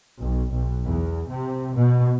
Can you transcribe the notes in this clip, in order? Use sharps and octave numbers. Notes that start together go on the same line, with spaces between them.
B1
B1
E2
C3
B2